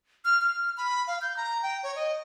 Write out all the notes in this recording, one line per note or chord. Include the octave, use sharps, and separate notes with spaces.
F6
F6
B5
F5
G6
A#5
G5
C#5
D#5